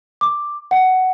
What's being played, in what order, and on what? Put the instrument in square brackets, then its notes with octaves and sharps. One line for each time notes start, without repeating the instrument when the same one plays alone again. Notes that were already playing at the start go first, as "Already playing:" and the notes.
[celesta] D6
F#5